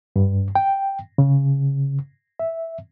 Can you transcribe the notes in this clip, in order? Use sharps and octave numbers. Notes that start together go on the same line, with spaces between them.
G2
G5
C#3
E5